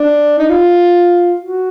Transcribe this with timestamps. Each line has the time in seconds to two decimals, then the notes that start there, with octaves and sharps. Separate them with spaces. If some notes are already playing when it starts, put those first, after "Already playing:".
Already playing: D4
0.39 D#4
0.50 F4
1.41 F#4